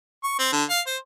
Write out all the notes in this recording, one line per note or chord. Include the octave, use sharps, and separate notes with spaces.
C#6
C4
D3
F5
C5